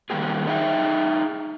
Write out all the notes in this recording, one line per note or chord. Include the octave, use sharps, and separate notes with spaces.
D#3 G3 A#3 G4 G#4
D4 D#4 G#4 E5 G5